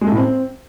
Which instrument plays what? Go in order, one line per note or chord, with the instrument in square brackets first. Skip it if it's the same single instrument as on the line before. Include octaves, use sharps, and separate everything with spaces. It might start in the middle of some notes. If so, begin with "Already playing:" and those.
[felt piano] G#3
A3
A2
C4